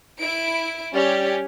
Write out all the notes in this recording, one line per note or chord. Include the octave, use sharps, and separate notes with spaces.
E4 D7
G3 C#4 G4